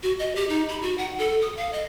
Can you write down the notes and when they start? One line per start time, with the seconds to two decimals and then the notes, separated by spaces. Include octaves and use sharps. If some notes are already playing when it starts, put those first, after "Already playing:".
0.03 F#4
0.19 D#5
0.36 G4
0.49 D#4
0.69 B5
0.82 F#4
0.98 F#5
1.18 A4
1.42 D#6
1.57 F5
1.73 D#5